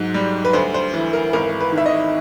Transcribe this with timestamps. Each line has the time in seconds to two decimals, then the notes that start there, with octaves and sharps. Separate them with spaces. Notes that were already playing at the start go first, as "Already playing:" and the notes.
Already playing: G#2 F#3
0.14 G3
0.45 B4
0.53 D2 C5
0.74 C5
0.94 E3
1.13 A#4
1.33 G#1 A#4
1.60 B4
1.72 D#3
1.78 E5
1.86 D#5